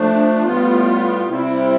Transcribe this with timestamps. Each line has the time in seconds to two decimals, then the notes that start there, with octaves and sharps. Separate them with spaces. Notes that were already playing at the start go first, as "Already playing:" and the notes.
Already playing: F3 A3 D4
0.43 A2 G3 B3 F4
1.29 C3 G3 C4 E4